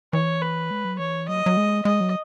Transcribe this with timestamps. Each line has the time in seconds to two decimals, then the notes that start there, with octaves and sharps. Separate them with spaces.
0.13 E3 C#5
0.42 B4
0.71 G#3
0.85 F#3
0.99 E3 C#5
1.28 F#3 D#5
1.46 F#3
1.57 G#3
1.85 G#3 D#5
2.00 F#3